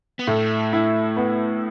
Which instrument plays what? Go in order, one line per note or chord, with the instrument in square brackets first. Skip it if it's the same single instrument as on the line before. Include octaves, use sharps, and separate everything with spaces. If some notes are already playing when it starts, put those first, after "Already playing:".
[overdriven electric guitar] B3
[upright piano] A2 [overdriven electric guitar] A3
[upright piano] E4
B3